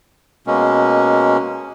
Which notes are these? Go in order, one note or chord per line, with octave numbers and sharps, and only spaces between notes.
B2 G#3 A#3 C#4